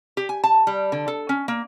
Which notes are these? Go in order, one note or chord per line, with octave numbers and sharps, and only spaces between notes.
G4
G#5
A5
G3
D3
A4
C#4
A#3